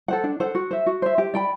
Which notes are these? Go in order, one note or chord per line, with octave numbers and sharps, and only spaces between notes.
A4 C5 F#5
D4
A4 C5 F#5
F#4
C5 E5
F#4
C5 E5
G4
D5 G5 B5